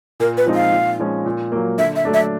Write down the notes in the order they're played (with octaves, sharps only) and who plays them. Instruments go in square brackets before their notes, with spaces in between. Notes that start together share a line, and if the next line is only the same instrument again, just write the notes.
[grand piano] A#2 [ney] A#4
[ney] B4
[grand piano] F3 G#3 C4 D#4
[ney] F5
[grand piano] A#2
F3 G#3 C#4
A#2
F#3 A#3
[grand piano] D3 [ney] E5
[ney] E5
[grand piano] F#3 A3 D4
[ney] E5